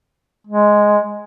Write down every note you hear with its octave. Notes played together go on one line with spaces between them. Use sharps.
G#3